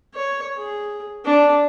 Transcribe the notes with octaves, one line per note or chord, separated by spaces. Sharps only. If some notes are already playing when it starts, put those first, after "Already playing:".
C#5
G#4
D4